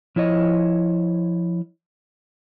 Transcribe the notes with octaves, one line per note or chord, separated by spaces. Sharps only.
F3 E4 C#5 D#5